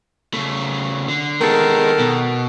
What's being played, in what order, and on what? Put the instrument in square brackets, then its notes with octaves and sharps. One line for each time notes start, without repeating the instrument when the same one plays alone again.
[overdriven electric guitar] C#3 A3
D3
[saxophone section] D#3 A4 A#4 [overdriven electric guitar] G#3 B3
[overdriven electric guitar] B2